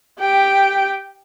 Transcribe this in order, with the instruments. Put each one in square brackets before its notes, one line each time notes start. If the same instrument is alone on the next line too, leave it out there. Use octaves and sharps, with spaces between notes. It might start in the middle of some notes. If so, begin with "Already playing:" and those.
[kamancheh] G4 G5